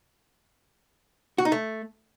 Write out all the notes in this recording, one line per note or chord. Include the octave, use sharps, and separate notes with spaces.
F#4
D#4
A3